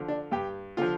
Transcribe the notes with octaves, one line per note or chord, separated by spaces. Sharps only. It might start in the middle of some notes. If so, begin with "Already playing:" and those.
Already playing: D3 F3
D4
G2 G4
D3 F3 F4